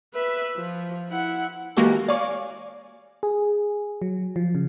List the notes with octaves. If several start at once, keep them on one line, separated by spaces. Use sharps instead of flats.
B4 E5
F3
E4 F#5
E3 G#3 A#3 F#4 G4 A4
C#5 D5 F5 G#5 C#6 D6
G#4
F#3
F3
C#3